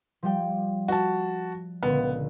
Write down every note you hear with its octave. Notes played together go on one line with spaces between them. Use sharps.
F3 G3 G5
F#4 A5
C#2 A#2 D3 B3